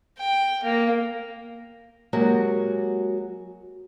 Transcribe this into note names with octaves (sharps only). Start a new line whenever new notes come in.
G5
A#3
F#3 G#3 A#3 F#4 G4